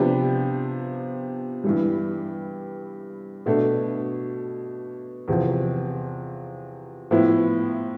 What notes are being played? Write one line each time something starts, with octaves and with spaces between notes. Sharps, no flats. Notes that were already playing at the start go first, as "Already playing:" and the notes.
Already playing: C3 F3 B3 D4 G4
G2 E3 G3
B2 A3 D4
E2 C3 F3
A2 F3 B3 E4